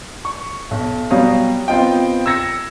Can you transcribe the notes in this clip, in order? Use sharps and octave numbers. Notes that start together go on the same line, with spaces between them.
C#6
B1
B2 F#3 G3 F5 D#6
B3 C4 F4 D#5 G5
E6 G#6 A#6 C#7